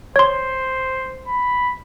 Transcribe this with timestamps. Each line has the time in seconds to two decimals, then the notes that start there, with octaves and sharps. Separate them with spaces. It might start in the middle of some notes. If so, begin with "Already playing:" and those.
0.16 C5 C#5 C6
1.27 B5